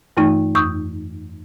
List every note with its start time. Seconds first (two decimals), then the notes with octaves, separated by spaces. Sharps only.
0.17 G2 E3 A3 D#4
0.55 F2 C#6 D#6 E6 G6